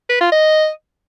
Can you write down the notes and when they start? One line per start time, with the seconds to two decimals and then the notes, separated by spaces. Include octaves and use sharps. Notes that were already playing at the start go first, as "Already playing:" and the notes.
0.09 B4
0.21 F4
0.32 D#5